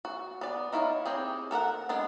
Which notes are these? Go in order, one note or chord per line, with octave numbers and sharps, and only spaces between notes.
F#4
B3 D5
D#4 E4 C#5 F5
C4 G4 G#4
A4 A#4 D#5 F#5
G#3 B3 D4 A4